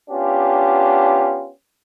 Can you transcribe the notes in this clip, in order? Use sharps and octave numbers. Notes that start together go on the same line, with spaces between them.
B3 C#4 D4 F4 G4